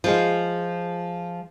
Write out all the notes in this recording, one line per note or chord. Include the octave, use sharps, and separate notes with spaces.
F3 G#3 F4